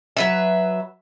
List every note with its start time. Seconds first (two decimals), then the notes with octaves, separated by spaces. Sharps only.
0.17 F#3 B4 E5